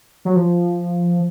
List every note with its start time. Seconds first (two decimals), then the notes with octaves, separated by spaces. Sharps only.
0.25 F#3
0.36 F3